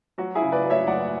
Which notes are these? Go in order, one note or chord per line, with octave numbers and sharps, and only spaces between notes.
F#3 F#4
E4 G#4
C#3
B4 D5
F#3
C#5 E5
F#1 D5 F#5